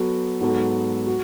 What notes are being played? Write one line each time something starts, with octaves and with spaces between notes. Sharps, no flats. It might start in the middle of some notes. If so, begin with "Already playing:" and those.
Already playing: F#3 B3 F#4 A4
G#2 F#3 B3 F#4 A4
F#4